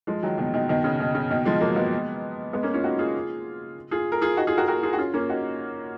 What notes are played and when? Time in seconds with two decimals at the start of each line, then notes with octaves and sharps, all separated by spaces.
0.07 F3 G#3
0.23 D#3 F#3
0.38 B2 D#3
0.53 B2 D#3
0.69 B2 D#3
0.84 C#3
1.00 B2 D#3
1.15 C#3
1.30 B2 D#3
1.45 F3 G#3
1.61 F#3 A#3
1.76 G#3 B3
2.53 G#3 B3
2.63 A#3 C#4
2.74 C#4 F4
2.84 D#4 F#4
2.99 F4 G#4
3.91 F4 G#4
4.12 A#4
4.21 F4 G#4
4.37 D#4 F#4
4.47 F4 G#4
4.57 F#4 A#4
4.68 F#4 A#4
4.83 F4 G#4
4.93 F#4
4.98 C#4 F4
5.14 A#3 C#4
5.29 D#4 F#4